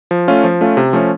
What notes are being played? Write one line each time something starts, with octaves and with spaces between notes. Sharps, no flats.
F3
A3 C#4 F4
F3
A3 C#4 F4
C3
F3 A3 C#4